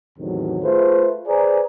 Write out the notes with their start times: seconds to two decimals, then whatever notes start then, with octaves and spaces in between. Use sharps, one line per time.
0.17 E2 A2 C3 D#3 F#3
0.62 A3 F4 G#4 B4 C5
1.26 G#4 B4 C5 D5 G#5 A#5